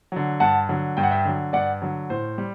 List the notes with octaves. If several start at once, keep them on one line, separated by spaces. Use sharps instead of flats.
D3 F#3
G2 F#5 A5
D3 F#3
G2 G5
F#5
E5 G5
D3 F#3
G2 D5 F#5
D3 F#3
A2 C5
G3